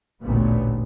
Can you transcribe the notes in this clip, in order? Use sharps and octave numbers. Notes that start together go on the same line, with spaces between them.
A1 D2 A#2 B3